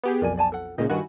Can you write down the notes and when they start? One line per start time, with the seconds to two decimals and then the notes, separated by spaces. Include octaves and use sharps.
0.03 B3 G4 G#4
0.21 B1 F2 A#4 D5 G#5
0.37 D5 G#5 A5
0.52 A4 F#5
0.78 C#2 A#2 C#3 D#4 C5 D#5
0.90 G2 D#3 E4 F#4 G#5 B5